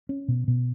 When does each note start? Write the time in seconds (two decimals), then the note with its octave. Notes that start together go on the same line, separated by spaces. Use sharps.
0.09 C#4
0.28 B2
0.48 B2